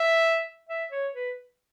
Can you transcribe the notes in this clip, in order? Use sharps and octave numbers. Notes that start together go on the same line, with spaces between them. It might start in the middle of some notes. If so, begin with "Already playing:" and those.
Already playing: E5
E5
C#5
B4